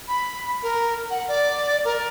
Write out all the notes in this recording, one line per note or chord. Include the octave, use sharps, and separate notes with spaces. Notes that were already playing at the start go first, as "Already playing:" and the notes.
B5
A#4
F#5
D5
A#4